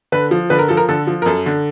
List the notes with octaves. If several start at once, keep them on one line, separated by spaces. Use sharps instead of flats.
D3 B4
F3
D3 B4
A#4
F3 A4
A#4
D3 A4
F3
A#4
F#2 A4
D3